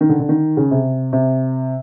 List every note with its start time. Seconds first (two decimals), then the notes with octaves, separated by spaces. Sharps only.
0.01 D#3
0.09 D3
0.19 D3
0.29 D#3
0.57 C#3
0.71 C3
1.13 C3